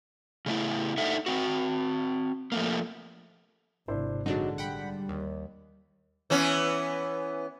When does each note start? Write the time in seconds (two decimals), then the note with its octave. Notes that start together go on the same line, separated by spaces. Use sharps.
0.46 C#3 A3 E4
0.98 D4 D#4 A4 E5 F#5
1.26 C4 F#4
2.52 F3 A3 A#3
3.88 G#1 C3 D4 E4 C5
4.26 A#1 D3 F#3 G#3 D4 D#4
4.58 G3 F#5 G5 B5
5.09 D#2
6.30 E3 B3 C#4